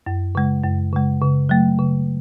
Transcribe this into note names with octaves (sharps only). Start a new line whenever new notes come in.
F#2
C#3 G#3
F#2
C#3 G#3
C#3
F#3 A3
C#3